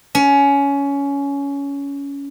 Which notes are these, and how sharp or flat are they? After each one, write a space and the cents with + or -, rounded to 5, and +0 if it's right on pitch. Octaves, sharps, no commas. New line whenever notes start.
C#4 +20